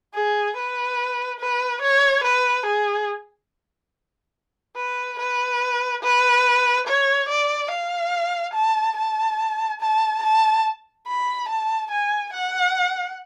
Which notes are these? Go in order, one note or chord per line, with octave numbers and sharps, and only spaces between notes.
G#4
B4
B4
C#5
B4
G#4
B4
B4
B4
C#5
D5
F5
A5
A5
A5
A5
B5
A5
G#5
F#5